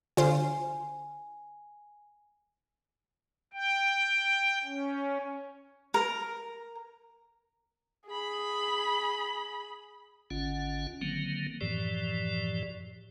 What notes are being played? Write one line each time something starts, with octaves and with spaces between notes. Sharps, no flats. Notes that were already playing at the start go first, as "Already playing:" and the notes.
D3 F4 C5 G#5
G5
C#4
A#4
G#4 B5
G#1 D3 C#4 F4 F#5
D3 D#3 F#3 A#3 C4
F#2 A2 E3 F3 G4 D5